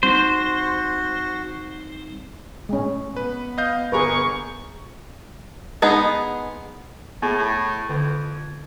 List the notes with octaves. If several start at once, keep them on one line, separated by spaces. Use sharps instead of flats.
G3 C4 D#4 F#4 C5
A2 G#3 C#4
B3 B4
D#5 F5 G6
G1 G#4 A#4 B4 A#5 C#6
G#3 B3 D#4 G#4
A2 B3 G#4
A2
F2 D3